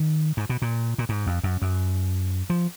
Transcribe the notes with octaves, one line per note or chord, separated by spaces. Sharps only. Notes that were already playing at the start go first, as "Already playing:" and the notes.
Already playing: D#3
G#2
B2
A#2
A#2
G#2
F2
F#2
F#2
F3